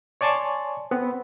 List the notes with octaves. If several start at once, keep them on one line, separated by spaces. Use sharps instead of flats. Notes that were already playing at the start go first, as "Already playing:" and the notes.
C#5 D5 G#5 A5 C6 C#6
B3 C4